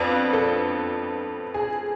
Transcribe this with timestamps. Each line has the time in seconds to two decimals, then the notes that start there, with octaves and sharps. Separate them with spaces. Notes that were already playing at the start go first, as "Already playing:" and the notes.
Already playing: F2 F3 B3 D4
0.33 A4
1.54 G#4